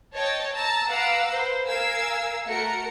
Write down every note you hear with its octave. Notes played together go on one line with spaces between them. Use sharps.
C#5 D#5 G5 A5
A5 A#5 E6
B4 F5 F#5 A#5 D6 E6
B4 C5
A#4 F5 G#5 E6
A3 F#4 A#4 C#7